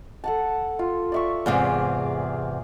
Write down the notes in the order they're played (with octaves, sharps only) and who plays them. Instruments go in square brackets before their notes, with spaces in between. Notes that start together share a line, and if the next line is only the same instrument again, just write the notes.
[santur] A4 F#5 A5
F4
D5 E5 C#6
[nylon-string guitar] E2 G#2 C3 [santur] G#4 D5 F5